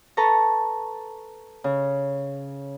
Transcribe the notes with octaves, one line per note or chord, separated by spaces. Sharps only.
A4 B4 A5 A#5 C#6
C#3